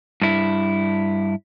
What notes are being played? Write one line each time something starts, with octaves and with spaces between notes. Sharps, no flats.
G2 E4